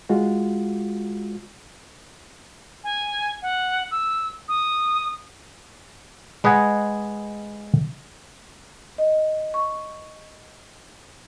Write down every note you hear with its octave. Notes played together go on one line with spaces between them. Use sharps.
G#3 F4 F#4
G#5
F#5
E6
D#6
G#3 B4 D#5 F#5 G#5
D#5
C#6